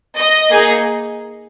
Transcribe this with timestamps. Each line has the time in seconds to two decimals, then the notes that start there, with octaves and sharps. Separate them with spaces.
0.18 D#5
0.50 A#3 D#4 G#4